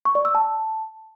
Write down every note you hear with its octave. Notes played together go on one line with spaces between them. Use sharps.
C#6
D5
E6
A5